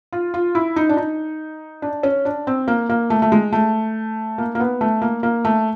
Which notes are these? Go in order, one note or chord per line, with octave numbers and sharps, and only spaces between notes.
F4
F4
E4
D#4
D4
D#4
D4
C#4
D4
C4
A#3
A#3
A3
A3
G#3
A3
A#3
A#3
B3
A3
A#3
A#3
A3